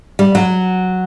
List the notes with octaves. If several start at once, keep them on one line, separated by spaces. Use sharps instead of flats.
G3
F#3